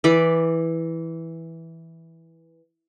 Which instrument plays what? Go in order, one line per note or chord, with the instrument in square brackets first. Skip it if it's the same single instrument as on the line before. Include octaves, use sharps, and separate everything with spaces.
[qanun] E3 D5 B5 D6